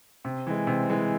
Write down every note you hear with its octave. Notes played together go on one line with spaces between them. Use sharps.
C3
E3 G#3
C3
E3 G#3